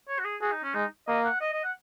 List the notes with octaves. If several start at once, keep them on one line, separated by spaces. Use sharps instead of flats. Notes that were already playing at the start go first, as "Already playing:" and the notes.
C#5
F#4
G#4
F#4 G#4
D#4
C#4
G#3 D#4
A#3 D#5
F#5
D#5
D#5
F#5